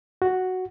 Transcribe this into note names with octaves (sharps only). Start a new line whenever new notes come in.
F#4